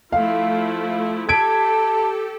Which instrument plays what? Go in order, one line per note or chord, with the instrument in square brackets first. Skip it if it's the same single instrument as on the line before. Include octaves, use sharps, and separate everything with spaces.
[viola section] F3 A3 E4 [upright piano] F5
[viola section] G4 A4 [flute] A5 [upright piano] G#6 B6 D7